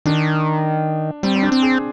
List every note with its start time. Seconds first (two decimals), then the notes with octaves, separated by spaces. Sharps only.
0.06 D#3 D4
1.23 G3 C4
1.36 C4
1.43 D4
1.52 C4
1.62 G#4